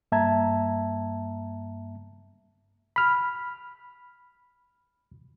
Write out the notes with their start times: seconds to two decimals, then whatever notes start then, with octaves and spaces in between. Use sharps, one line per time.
0.12 G2 A#3 E5 A5 A#5 G#6
2.96 B5 F6